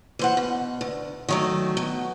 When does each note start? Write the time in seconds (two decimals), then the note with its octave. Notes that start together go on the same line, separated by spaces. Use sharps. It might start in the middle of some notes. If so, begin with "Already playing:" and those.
0.19 E3 C5 F#5
0.37 B2
0.81 D2
1.29 D#3 F#3 A3
1.77 B2